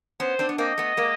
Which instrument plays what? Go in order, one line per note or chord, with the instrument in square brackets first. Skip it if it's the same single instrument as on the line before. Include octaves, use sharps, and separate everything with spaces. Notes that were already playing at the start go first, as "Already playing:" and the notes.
[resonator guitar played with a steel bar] B3 C#4 [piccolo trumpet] C5
[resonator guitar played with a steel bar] C4 D4
B3
[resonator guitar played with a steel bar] A#3 C4 [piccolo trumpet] D#5
[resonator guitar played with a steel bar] A3 B3
G#3 A#3